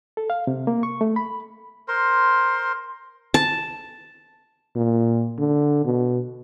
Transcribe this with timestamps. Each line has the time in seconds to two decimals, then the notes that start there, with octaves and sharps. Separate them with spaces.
0.17 A4
0.30 F5
0.47 C3
0.67 A#3
0.83 C#6
1.01 A3
1.16 B5
1.88 A#4 C5 C6
3.34 A5
4.76 A#2
5.38 D3
5.85 B2